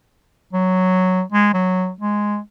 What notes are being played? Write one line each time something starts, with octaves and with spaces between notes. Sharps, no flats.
F#3
G#3
F#3
G#3